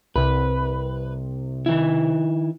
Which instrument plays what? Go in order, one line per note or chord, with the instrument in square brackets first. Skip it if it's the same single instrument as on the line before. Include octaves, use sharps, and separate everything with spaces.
[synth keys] C2 C3 [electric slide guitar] B4
[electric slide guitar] D#3 E4